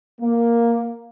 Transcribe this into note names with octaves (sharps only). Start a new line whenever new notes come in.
A#3